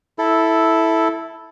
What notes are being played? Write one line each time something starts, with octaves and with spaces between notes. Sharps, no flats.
E4 A4